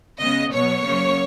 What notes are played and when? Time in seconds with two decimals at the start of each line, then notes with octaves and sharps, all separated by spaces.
0.20 C#3 G#3 B3 D#5
0.52 B2 F#3 B3 C#5
0.84 C#3 F#3 A#3